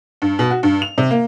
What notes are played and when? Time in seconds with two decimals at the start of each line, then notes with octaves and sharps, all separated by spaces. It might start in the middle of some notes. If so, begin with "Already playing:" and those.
0.22 G2
0.39 B2
0.51 F#4
0.63 G2
0.82 F7
0.98 C3
1.11 A#3